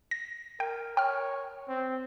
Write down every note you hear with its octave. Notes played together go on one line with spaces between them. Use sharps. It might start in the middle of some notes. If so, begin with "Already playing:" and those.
A#6
A#4 G5
C#5 G5 F6
C4